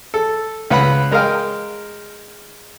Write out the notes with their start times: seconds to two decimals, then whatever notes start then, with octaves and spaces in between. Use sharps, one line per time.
0.14 A4
0.70 C#2 B4 F#5 B5
1.11 G#3 A#4 D#5 F5 G5